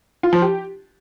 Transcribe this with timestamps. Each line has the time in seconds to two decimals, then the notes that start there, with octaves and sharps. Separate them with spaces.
0.23 F4
0.33 F3
0.42 G4